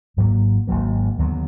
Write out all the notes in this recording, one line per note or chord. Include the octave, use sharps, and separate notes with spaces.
G#1 G#2 F#3 A#3
G#1 G#2 F#3 A#3
D#2 D3 F#3 B3